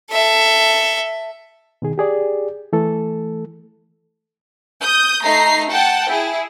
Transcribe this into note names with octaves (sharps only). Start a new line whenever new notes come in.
A4 E5
B2 D#3 G#4
G4 G#4 D5
E3 A3 A4
D#6 G6
A3 D#4 A#5 C7
F#5 G5 A5
E4 G#4